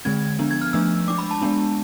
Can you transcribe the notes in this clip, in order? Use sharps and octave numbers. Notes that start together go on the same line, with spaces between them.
D3 G#3 C4 G#6
F3 B3 D4
G#6
F6
F3 A3 D4 E6
G#3 D4 D6
B5
A5
G#3 B3 D4